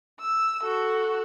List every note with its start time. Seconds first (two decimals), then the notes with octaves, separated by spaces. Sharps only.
0.20 E6
0.63 F#4 A4